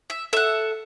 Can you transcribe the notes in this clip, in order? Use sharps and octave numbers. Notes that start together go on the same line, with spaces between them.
E5
A4 E5 F#5